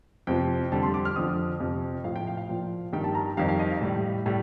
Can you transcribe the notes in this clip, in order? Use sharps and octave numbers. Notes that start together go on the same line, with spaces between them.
F2 C3 F3 G5
F2 D3 G3 A5
C6
D6
F6
F2 D3 F3 D#6
F2 C3 F3
A2 F3 F5
G5
F5
F5
A#2 F3
G2 D#3 G3 G5
A5
A#5
F2 D#3 G3 F5
F5
D#5
F5
A2 G3
A2 G3